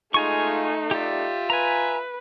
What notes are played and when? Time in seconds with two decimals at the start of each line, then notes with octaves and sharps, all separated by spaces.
0.14 G#3 A3 D#4 F4 F5 G#5 C#6
0.91 F4 G4 D5 E5
1.50 B4 G#5 A#5